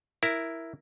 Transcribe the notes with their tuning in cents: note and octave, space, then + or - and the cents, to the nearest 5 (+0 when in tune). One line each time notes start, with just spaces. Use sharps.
E4 +0 A#4 +0